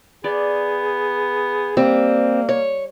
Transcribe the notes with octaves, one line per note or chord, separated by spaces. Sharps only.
B3 G#4 D5
G3 A#3 C4
C#5